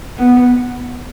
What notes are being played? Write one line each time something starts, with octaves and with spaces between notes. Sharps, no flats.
B3